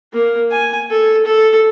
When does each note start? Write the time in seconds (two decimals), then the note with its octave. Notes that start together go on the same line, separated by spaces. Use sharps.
0.13 A#3
0.51 G#5
0.90 A4
1.26 A4